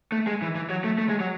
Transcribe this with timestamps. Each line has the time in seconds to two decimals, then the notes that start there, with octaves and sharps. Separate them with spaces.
0.12 A3
0.27 G#3
0.42 E3
0.55 E3
0.70 F#3
0.84 A3
0.98 A3
1.09 G#3
1.20 F#3